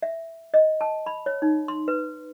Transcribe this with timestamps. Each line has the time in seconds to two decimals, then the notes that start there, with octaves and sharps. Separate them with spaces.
0.03 E5
0.54 D#5
0.81 A5
1.06 B5
1.26 C#5
1.42 D#4
1.68 C6
1.88 B4